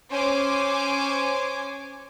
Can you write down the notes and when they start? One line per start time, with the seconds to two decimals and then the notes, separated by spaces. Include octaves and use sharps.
0.11 C#4 C5 G#5 D6